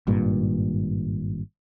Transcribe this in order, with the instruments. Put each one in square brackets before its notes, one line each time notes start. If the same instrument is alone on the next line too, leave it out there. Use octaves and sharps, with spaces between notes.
[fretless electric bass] G#1 G2 A#2